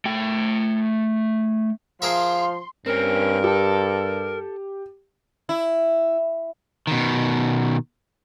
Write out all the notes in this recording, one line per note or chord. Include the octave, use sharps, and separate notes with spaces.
A3 G5
F3 G#4 A#4 E5 F5 C6
G2 C4 C#4 A#4
G4 A4 A5
E4
B2 D#3